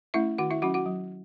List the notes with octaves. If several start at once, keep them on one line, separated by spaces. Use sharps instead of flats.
A3 C#4 E4 E5
D#3 F#4 F#5
E4 E5
F#3 C#4 F#4 F#5
F#4 F#5
F#3